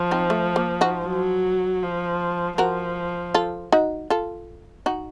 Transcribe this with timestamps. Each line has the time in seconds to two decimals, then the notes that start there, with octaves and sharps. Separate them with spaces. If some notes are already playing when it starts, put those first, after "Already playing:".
Already playing: F3
0.11 C4 D#4
0.30 A3
0.56 A#3
0.81 D#4 F#4
1.06 F#3
1.82 F3
2.58 F3 F#4 A#4
3.34 F4 A4
3.72 D#4 F#4
4.10 F4 A4
4.86 D#4 F#4